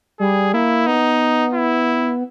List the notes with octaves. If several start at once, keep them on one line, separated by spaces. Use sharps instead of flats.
G3 G#4
A#3 E4
B3 D#4
E4